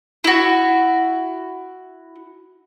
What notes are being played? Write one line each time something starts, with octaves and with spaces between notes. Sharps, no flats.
E4 F#4